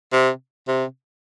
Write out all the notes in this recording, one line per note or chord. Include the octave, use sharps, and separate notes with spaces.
C3
C3